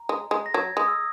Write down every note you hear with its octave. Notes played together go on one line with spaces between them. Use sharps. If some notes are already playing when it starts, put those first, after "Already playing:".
Already playing: A#5
G#3
G#3
A#6
F#3 G#6
G#3 D#6
E6